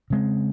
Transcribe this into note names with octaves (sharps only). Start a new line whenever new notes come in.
C#3 G#3 C4